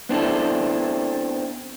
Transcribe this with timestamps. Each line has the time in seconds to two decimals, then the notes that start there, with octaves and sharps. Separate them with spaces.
0.09 B3 C4 D4 E4 A4